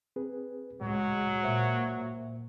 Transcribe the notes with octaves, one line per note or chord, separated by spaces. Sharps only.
C4 G#4 B4
C#2 A2 F#3 G#3
A#2 C5 E5